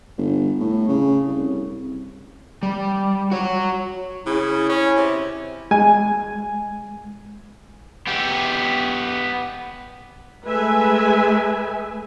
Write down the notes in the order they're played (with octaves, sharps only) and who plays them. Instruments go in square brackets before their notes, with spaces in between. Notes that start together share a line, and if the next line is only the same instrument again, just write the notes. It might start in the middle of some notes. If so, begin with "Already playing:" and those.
[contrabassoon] G1
A2
C#3
C2
[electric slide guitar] G3
F#4 C#5
[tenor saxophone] C#3 [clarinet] E4
[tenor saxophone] C#4
C3
[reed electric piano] G#3 [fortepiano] G#5
[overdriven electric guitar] B3 G4
[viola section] G#3 A3 B4 E5 G#5